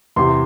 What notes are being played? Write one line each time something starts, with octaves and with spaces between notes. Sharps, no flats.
E2 C3 E3 C6